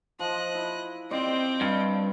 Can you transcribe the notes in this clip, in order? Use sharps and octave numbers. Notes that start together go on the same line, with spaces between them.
F3 D#5 F#6
E4
C4 F4 D5 D#5 G5
G2 F5